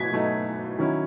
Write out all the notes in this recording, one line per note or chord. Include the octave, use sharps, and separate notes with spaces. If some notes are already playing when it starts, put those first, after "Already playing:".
Already playing: B2 F#3 A3 G#6 B6
B2 F#3 A3 D#4
D#3 F#3 C#4 E4